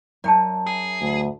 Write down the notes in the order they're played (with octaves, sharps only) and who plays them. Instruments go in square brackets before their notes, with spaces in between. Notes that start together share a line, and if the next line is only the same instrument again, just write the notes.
[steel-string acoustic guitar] F#2 [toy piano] D5 G5 A5
[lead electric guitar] G#4
[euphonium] D2